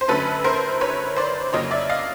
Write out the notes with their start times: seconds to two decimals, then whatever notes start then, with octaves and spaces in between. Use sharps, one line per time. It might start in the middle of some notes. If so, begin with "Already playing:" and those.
0.01 C5
0.08 F#2 D3 F#3 A3 C#4 A4 B4
0.44 A#4 C5
0.81 B4 C#5
1.17 C5 D5
1.53 F2 C#3 F#3 A#3 C#5 D#5
1.71 D5 E5
1.89 D#5 F5